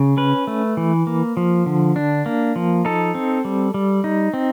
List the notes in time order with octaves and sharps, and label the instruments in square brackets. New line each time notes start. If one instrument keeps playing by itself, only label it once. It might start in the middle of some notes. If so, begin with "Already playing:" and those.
Already playing: [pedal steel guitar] C#3
C#4 B4
A3
E3
A#3
F3
D3
D4
A#3
F3
D#4 A4
C4
G3
G3
D#4
C4